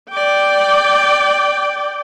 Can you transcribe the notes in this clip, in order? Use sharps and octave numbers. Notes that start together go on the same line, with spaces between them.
D5 G5